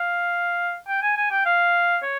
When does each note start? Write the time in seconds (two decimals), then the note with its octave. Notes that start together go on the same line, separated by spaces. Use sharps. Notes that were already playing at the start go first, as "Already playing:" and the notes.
Already playing: F5
0.88 G5
1.02 G#5
1.17 G#5
1.31 G5
1.46 F5
2.03 C#5